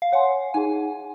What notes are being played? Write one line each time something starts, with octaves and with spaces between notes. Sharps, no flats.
F5
C#5 F#5 G#5 C6
D#4 G#4 G#5